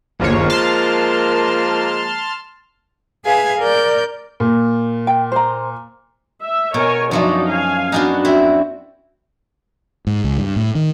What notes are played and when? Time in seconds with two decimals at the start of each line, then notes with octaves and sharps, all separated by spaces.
0.20 G1 D#2 F3 G#3 A#3 C#5
0.50 A5 C6 F6
3.25 G#4 B4 E5 F5 G#5
3.58 A#4 D5 G6
4.40 A#2
5.07 G5
5.32 C5 A#5
6.42 E5
6.74 B2 A#4 C#5 G#5
7.11 F#2 F3 C#4 D#4 F#4 D5
7.47 F5 G#5
7.92 B3 D4 D#4 F#4
8.25 C4 E4
10.07 G#2
10.24 C#2
10.38 G2
10.56 A2
10.75 D#3